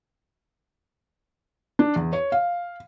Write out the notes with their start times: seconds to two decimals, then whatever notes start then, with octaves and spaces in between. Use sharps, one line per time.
1.79 D4
1.96 E2
2.13 C#5
2.32 F5